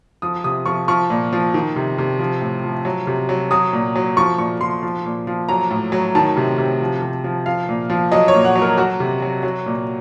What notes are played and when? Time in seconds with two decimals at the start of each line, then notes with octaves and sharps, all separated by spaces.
0.22 F3 D#6
0.44 C3 D#6
0.66 F3 C#6
0.88 F3 C#6
1.10 A#2
1.33 F3
1.54 D#3
1.76 C3
1.98 C3
2.19 F3
2.41 A2
2.64 F3
2.85 F#3
3.07 C3
3.29 F#3
3.51 F#3 D#6
3.73 A#2
3.96 F#3
4.17 F3 C#6
4.38 A#2 C#6
4.61 F3 C6
4.83 F3
5.05 A#2
5.27 F3
5.49 F#3 A#5
5.70 A2
5.92 F#3
6.15 D#3 A5
6.37 C3
6.58 C3
6.81 F3
7.02 C3
7.24 F3
7.46 F3 F5
7.69 A#2
7.90 F3
8.12 F#3 D#5
8.28 C#5
8.35 A#2
8.45 F#5
8.55 F#3
8.62 A#4
8.77 F#3 F#4
9.00 C3
9.22 F#3
9.43 F#3
9.66 A#2